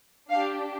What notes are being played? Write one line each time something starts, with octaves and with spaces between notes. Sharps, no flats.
D4 G4 F5